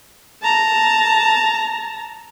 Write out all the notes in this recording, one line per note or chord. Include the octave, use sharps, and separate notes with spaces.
A5 A#5